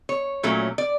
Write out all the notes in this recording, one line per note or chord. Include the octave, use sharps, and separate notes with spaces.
C#5
A#2 F#3 A3 C#4
D5